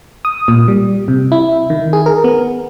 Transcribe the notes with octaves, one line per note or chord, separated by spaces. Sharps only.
D#6
A#2
G3
C3
E4
D#3
G#4
A#4
B3